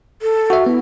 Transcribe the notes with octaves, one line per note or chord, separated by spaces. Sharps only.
A4
F#4 E5
B3 E4